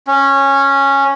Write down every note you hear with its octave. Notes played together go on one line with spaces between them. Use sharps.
C#4